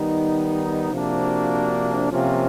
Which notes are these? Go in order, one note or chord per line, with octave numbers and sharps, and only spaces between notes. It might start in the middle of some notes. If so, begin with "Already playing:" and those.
Already playing: D#3 G3 B3 D#4
C3 F3 A#3 D4 F#4
C3 F3 A#3 C#4 F4